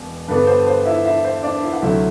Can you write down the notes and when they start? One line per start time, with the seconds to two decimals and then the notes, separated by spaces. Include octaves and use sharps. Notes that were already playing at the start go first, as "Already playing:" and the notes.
Already playing: E1 B2
0.28 G2 D3 G3 B3 D4 B4
0.47 C5
0.67 C5
0.85 E4 E5
1.05 E4 E5
1.24 C5
1.43 D4 D5
1.63 E4 E5
1.73 F#5
1.82 D2 C3 F#3 E4 E5